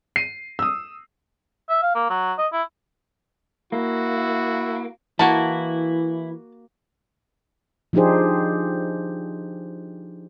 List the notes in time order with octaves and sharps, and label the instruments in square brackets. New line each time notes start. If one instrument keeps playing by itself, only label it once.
[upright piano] C7 D#7
D#6 E6
[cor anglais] E5
F5
A#3
F#3
D#5
E4
[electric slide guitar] A#3 [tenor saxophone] E4 [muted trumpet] F#4
[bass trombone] E3 [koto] A#3 F#4 [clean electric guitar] E4 [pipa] A5
[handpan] F3 D4 D#4 G4 G#4 C5